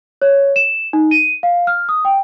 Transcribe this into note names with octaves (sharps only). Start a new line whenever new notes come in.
C#5
E7
D#4
D#7
F5
F6
D#6
G5